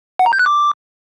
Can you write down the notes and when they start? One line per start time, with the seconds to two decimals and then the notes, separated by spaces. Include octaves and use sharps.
0.19 F#5
0.26 A#5
0.33 G6
0.39 F#6
0.46 D6